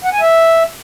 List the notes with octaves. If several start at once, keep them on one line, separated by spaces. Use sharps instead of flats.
F#5
G#5
E5